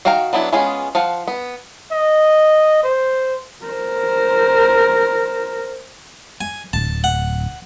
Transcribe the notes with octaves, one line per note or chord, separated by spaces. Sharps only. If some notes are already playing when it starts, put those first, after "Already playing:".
D#3 F#4 F5 G5 A#5
F#3 B3 D4 E4
G#3 B3 C#4 F4 G#4
F3 F5 F#5
B3
D#5
C5
A#4 C5
G#5
D1 A5
F#5